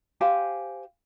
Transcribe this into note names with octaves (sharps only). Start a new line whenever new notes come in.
G4 C5 F5 G#5